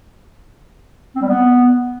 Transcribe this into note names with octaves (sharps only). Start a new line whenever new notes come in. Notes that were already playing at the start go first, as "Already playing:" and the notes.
C4
G3
B3